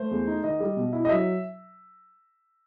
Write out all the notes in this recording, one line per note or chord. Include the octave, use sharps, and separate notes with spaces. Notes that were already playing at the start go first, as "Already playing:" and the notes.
Already playing: A3 C5
E2
D#4
D#3 D#5
G3
B2
E4
D#5
F#3 E5